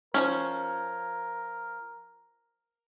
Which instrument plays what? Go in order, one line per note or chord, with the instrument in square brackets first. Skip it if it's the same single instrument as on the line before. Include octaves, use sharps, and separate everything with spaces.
[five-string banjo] F3 F#3 C#4 [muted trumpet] A#4